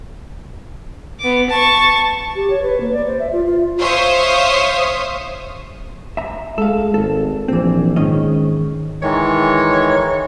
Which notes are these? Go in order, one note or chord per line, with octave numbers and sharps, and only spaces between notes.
B3 D6
A5 C#6
G4
C#5
B4
A#3
D5
C5
E5
F4
F4
C5 C#5 E5 F5 C#6 D#6
E5 A#5
G#3 A4 F5
G#1 A4
A#1 E3 C4
G#2 D#3 C#4 D#5
D#3 E3 G#3 C#5